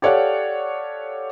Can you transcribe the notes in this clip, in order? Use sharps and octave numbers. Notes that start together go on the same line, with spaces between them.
G4 A4 C#5 D5 F5 F#5